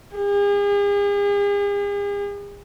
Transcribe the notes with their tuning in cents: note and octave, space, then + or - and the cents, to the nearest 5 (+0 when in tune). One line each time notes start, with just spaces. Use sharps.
G#4 -45